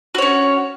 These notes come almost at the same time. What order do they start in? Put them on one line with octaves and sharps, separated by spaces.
F#4 C#5 C#4